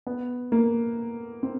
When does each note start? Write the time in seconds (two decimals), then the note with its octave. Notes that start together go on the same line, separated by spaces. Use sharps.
0.07 B3
0.52 A#3
1.43 C4